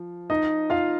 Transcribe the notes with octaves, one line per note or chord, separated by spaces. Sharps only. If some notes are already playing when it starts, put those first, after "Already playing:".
Already playing: F3
D#4 D#5
F4 F5